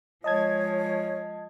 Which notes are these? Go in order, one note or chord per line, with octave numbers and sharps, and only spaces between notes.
F3 G#3 C#5 D#5 A5 G#6